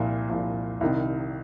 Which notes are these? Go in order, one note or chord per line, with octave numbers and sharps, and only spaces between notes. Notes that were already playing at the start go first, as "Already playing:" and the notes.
Already playing: C2 A#2 F3
C2 A#2 F3
C2 C3 D#3